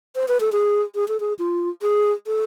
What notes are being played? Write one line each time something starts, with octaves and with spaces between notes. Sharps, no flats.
C5
B4
A4
G#4
G#4
A4
G#4
F4
G#4
A4